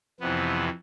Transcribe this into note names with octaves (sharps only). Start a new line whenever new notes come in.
F2 C3 E3 B3